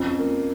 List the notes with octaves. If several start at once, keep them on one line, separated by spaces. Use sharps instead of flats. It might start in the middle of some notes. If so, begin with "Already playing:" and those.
Already playing: F2 C#4 F4
A#3